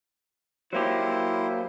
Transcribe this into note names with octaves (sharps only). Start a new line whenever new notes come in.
F#3 A#3 E4 G4 C5